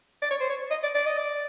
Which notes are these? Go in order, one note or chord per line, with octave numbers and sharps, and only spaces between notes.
D5
C#5
C5
C#5
D#5
D5
D5
D#5
D5